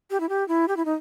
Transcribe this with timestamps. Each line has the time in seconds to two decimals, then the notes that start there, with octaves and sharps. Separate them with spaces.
0.11 G4
0.20 E4
0.29 G4
0.48 E4
0.68 G4
0.77 E4
0.85 D#4